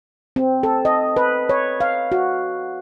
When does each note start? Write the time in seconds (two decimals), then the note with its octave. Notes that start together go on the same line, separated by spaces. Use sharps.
0.36 C4
0.63 A4
0.85 D#5
1.17 B4
1.49 C#5
1.81 F5
2.12 F#4